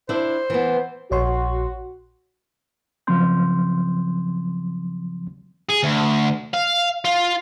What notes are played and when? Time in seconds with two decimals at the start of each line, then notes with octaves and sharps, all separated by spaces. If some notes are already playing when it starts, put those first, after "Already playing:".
0.09 D4 E4 C5
0.50 E3 B3
1.11 A#1 F#4 C#5 C6
3.07 C#3 F3 F#3 C4 C6 G6
5.70 G#4
5.84 D2
6.54 F5
7.05 F4